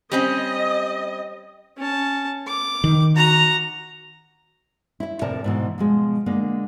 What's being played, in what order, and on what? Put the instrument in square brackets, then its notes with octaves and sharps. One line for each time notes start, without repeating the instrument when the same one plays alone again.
[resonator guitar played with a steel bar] G3 C4 C#4 [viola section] D#5
[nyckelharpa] C#4 A5
D6
[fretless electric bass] D#3
[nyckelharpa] F#4 A#5
[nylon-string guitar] E4 E5
F2 A2 C3 A#4 D5 A5
G#2 B2 E3
B2 F3 G#3
D3 G#3 A#3